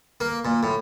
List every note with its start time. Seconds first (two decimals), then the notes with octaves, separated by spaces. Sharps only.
0.21 A#3
0.45 A#2
0.63 A2